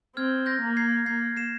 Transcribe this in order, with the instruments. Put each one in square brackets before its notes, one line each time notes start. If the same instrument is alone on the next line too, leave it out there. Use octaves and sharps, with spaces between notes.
[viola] C4 [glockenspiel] F6 G#6
[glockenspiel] G6 A#6
[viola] A#3
[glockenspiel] G#6 C7
[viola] A#3 [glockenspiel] G#6 C7
[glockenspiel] C7 E7